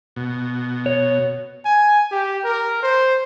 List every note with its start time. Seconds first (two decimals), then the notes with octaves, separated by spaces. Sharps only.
0.16 B2
0.86 C#5
1.65 G#5
2.11 G4
2.44 A#4
2.83 C5